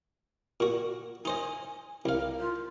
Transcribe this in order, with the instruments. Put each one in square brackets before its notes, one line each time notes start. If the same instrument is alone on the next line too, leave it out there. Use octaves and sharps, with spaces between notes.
[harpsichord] A#2 F#4
[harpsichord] D#4 C5 D#5 [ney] G#5
[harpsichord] C2 F5 [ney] A#4
[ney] F4